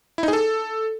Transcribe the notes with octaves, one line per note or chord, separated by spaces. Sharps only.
E4
D#4
G#4
A4